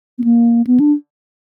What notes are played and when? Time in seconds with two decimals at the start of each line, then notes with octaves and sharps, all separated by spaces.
0.19 B3
0.24 A#3
0.67 B3
0.80 D4